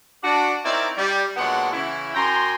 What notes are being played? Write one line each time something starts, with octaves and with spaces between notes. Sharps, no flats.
D4 F#4
C4 C#4 D#4 E4 A#4 D5
G3
A#2 F#3 G#3 B3 D4 F#5
C#3 E3 C#4 E4
F#2 G5 G#5 A#5 C6